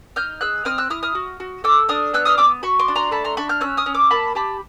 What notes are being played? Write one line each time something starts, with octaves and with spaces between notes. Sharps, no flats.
D#4 F6 G6
G#4 E6 F#6
C4 D#6 F6
E6 F#6
E4 D#6 F6
D#6 F6
F#4
F#4
A4 D6 E6
D4 D#6 F6
B3 E6 F#6
D#6 F6
B3 D6 E6
F#4 B5 C#6
C6 D6
D4
A#5 C6
A3 A5 B5
A#5 C6
D4 B5 C#6
F6 G6
C#4 E6 F#6
D#6 F6
C#4
D6 E6
A#3 A5 B5
G4 A5 B5